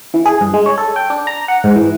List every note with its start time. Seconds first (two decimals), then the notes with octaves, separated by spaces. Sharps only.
0.14 E3
0.26 G#4
0.41 G2
0.54 G#3
0.66 C#5
0.78 A4
0.96 G5
1.10 D4
1.27 A#5
1.48 F#5
1.64 G#2
1.76 E3